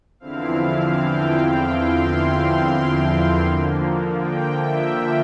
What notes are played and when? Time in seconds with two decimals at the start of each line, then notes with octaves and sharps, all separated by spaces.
0.20 E2 D3 F3 C4 E4 F5
1.00 G5
1.79 C6
3.38 D3 F3 A#3
4.18 G5
4.58 E5